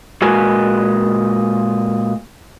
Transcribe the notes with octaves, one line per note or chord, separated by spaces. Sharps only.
A#2 G#3 F#4 A#4 B4 G#5